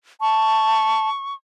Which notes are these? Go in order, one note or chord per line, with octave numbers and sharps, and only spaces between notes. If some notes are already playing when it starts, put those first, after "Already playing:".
A5 C#6